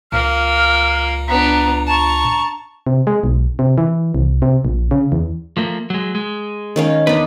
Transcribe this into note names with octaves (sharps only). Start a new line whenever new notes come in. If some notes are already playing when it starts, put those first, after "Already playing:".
C#2 A#2 A#3 F6
B3 D4 A#5
A5 A#5 C#6
C3
G#3
B1
C3
E3
C2
C3
A#1
C#3
E2
F3 A3 A#3
F#3 G#3
G#3
D#3 C#4 F5
E2 B3 D4 D#4 B4